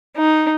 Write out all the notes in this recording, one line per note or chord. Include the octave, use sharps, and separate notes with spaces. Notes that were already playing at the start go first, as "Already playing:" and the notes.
D#4